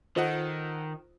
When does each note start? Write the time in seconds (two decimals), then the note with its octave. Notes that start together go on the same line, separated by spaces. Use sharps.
0.16 D#3 F4 A4 C5 D#5 F#5